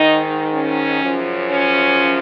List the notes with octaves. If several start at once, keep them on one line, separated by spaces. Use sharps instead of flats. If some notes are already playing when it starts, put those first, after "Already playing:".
Already playing: G#2 D#3 D#4
C#4
F#2 C#3 F3
C#4